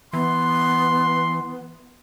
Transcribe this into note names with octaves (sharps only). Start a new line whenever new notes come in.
E3 B3 C6